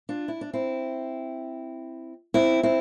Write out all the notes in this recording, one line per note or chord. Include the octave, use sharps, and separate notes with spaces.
D4 F4
E4
D4
C4 E4
C4 E4
C4 E4